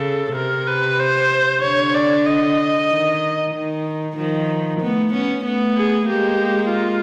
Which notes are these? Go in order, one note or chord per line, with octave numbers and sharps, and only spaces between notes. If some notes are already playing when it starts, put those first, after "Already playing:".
Already playing: C#3 A4
C3 A#4
B4
C5
D3 C#5
D5
D#5
D#3
D#3
D#3 F3
A3 B3
B3 C#4
A3 B3
G#4
G#3 A#3 G4
F4